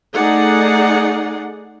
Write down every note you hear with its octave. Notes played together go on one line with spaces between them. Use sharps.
A3 D#4 G#4 D5 F#5